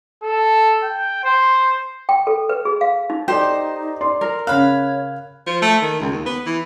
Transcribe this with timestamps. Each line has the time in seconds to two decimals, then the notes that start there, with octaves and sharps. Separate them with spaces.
0.23 A4
0.83 G5
1.24 C5
2.09 G5
2.27 A4
2.49 B4
2.65 G#4
2.81 F5
3.10 D#4
3.28 D#4 G4 A4 C5 D5
4.01 D5 C6
4.21 A#4
4.47 C#3 C#5 F5 B5 F#6
5.46 F3
5.62 A3
5.82 D#3
6.00 C#2
6.12 D#2
6.26 B3
6.46 E3